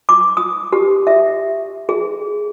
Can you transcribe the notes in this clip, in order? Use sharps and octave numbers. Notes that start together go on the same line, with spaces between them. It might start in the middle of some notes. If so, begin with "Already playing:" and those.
D6
D#6
G4
E5
G#4